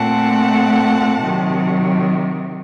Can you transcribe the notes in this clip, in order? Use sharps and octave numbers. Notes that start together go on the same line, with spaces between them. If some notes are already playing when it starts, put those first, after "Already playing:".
Already playing: A#2 A3 C4 F#5 A5
C3 D#3 F#3